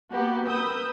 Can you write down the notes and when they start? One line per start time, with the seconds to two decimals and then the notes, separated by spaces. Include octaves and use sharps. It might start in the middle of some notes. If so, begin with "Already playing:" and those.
0.13 A#3 B3 F#4 G4
0.47 A#4 B4 D#6 E6 G6